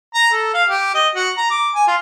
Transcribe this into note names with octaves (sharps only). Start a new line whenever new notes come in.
A#5
A4
F5
G4
D#5
F#4
A#5
D6
G#5
F4